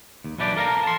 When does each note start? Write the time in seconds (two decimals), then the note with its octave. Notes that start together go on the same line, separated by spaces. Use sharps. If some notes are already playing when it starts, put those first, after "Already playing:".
0.24 D#2
0.38 B1 B2 E3 D4 G4 D5
0.57 A4 A#4 F5 A#5
0.83 A5 C6